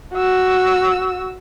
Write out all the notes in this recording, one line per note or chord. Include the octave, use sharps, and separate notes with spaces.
F#4 E6